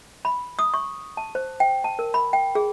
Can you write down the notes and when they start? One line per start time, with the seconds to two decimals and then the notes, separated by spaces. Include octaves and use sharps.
0.25 B5
0.59 D#6
0.74 C#6
1.17 A5
1.35 C5
1.60 G5
1.84 A5
1.99 A#4
2.14 B5
2.33 G5
2.55 G#4